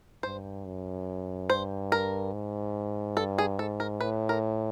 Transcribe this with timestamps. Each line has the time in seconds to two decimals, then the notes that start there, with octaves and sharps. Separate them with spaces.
0.23 G2 C5
0.66 F#2
1.50 G2 C5
1.92 A#4
2.33 G#2
3.17 G2 A4
3.38 G#4
3.59 G#2 A4
3.80 A#4
4.01 A2 B4
4.29 A#4